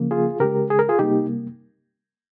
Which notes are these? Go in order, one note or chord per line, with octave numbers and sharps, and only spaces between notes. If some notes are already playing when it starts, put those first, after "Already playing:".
Already playing: C#3 F3 A#3
F4 G#4
C#3 G#3 G4 A#4
G#4
A#4
F4 G#4
C3 G3 A#3 D#4 G4